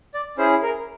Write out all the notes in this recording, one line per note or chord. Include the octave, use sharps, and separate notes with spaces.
D5
C#4 E4 G#4 C5
A#4